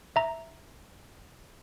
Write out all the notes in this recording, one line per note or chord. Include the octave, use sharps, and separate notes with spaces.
E5 A#5